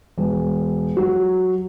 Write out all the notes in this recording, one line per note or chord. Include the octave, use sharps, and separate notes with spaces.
E1
F#3